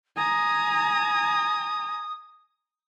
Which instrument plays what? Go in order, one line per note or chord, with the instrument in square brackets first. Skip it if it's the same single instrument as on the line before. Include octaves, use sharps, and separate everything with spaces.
[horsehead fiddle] G#5 A#5 [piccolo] D#6